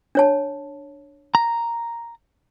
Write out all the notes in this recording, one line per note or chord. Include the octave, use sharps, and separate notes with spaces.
D4 C#5 A5
A#5